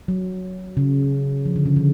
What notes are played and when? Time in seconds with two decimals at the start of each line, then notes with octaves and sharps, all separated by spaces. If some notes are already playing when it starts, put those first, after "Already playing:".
0.08 F#3
0.77 C#3
1.46 F3
1.56 D3
1.66 C#3
1.76 D3